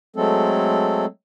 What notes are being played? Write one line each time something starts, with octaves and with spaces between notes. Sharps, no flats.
F#3 G#3 A3 C4 A4